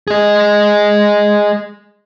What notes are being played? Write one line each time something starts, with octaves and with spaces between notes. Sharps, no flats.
G#4 D#5